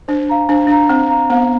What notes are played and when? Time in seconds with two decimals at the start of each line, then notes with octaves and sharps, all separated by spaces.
0.08 D4 C5
0.29 F5 A#5
0.49 D4 C5
0.67 D4 F5 A#5
0.89 C4 C5
1.10 F5 A#5
1.30 B3 C5